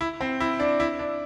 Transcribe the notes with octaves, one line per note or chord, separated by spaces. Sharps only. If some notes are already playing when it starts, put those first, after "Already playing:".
E4
C4
E4
D4
E4
D4